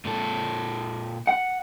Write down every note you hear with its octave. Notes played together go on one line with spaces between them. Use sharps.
A#2 A4
F#5